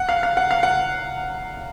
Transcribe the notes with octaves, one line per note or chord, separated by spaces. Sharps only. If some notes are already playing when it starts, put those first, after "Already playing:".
Already playing: F#5
F5
F5
F#5
F5
F#5